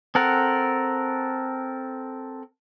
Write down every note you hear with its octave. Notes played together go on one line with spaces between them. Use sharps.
C4 A4 A#4 F#5